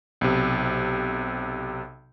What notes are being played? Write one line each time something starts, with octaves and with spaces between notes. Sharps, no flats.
B1 C3